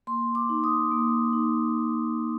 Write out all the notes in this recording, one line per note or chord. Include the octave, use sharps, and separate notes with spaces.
A#3 C6
D6
D#4
D#6
A#3
D#4